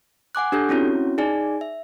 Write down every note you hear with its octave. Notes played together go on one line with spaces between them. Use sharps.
F#5 G#5 D6 F#6
D4 G4 A4 G6
C4 C#4 E4 F#4 C#5
D#4 G#4 D5 G#5
E5